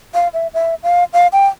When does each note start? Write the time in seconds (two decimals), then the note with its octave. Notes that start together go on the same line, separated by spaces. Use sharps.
0.14 F5
0.34 E5
0.54 E5
0.83 F5
1.13 F5
1.32 G5